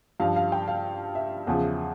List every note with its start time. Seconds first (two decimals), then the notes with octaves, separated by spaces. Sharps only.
0.20 G2 F3 F5
0.36 F5
0.52 G5
0.68 F5
1.15 E5
1.47 E2 C#3 F3